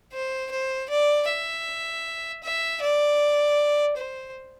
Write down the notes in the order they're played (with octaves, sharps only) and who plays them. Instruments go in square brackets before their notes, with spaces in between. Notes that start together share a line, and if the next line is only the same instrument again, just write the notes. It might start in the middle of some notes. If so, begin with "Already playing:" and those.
[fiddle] C5
C5
D5
E5
E5
D5
C5